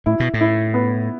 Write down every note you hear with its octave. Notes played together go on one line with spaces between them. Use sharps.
A2 E4
B2
A2
E4
B3